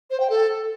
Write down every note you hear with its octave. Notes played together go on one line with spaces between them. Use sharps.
C5
G5
A4